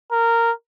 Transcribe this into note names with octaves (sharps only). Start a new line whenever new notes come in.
A#4